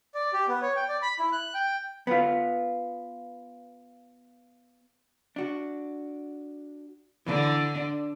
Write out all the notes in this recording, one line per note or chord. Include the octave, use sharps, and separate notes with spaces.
D5
G4
B3
C#5
G5
D5
B5
E4
F#6
G5
B3 F4
D4 F#4
D3 E3 D4
D4